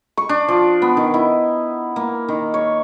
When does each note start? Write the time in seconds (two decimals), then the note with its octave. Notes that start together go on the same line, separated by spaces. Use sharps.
0.17 C#6
0.29 D4
0.48 F3
0.82 B3
0.97 D#3
1.14 E4
1.96 A#3
2.28 D#3
2.54 C#5